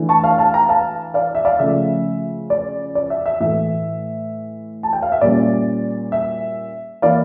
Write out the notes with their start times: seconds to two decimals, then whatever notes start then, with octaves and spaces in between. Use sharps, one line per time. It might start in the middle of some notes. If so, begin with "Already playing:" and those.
Already playing: E3 A3 D4
0.09 A5 C#6
0.24 F5 A5
0.38 F5 A5
0.54 G5 A#5
0.69 F5 A5
1.14 D5 F5
1.35 E5
1.45 D5 F5
1.59 C#3 F3 A3 E5
2.50 D5
2.95 D5
3.10 E5
3.26 E5
3.40 A2 E3 A3 E5
4.83 A5
4.93 G5
5.02 F5
5.12 E5
5.21 A#2 G3 C#4 D5
6.12 E5
7.02 E3 A#3 E4 D5 F5